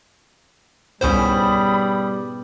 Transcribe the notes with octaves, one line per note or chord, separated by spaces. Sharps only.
C2 G#2 B2 G3 C#4 C5 B5 D#6